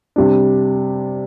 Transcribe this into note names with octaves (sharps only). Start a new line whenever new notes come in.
C3 G3 D4